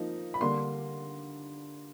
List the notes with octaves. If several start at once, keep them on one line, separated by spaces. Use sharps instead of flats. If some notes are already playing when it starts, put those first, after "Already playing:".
Already playing: F3 A#3 D#4
B5
D3 G3 A#3 D4 C6